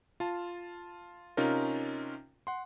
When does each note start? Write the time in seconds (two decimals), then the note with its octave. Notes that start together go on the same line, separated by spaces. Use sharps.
0.20 F4 A5
1.37 C3 C#4 D#4 F4 A#4
2.47 F#5 C6